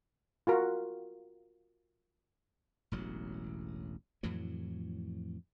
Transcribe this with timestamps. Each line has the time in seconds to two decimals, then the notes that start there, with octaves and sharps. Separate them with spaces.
0.47 F4 F#4 A#4
2.92 E1 A1 F#3
4.23 F2 A2 E3 F#3